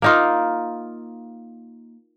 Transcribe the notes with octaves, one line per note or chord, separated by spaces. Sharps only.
A#3 D#4 F4